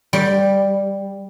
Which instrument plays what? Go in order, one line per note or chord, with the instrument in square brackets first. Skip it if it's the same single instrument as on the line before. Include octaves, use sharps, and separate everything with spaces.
[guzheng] G3